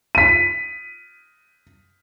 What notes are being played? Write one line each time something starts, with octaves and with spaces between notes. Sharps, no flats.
B6 D#7